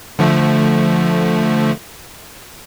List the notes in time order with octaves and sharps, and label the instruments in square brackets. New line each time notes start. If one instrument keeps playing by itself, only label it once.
[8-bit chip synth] D3 F3 A3